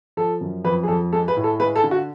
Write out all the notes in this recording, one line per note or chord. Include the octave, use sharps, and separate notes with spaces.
F3 A4
F#2
F2 B4
G#4
F2 A4
G#3 A4
B4
A2
A4
G#3 B4
A4
D3
F#4